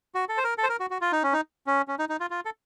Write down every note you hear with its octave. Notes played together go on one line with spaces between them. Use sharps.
F#4
A4
C5
A#4
A4
C5
A#4
F#4
F#4
F4
D#4
C#4
D#4
C#4
C#4
D#4
D#4
F4
F4
A4